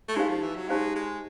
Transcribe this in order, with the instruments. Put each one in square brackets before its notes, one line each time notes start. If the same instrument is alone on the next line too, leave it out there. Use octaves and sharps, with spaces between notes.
[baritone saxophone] A3
[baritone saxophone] G#3 [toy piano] D#4 G4 C5 F5
[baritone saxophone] F3
E3
F#3
[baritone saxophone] G#3 [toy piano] D#4 G4 C5 F5
[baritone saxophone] G#3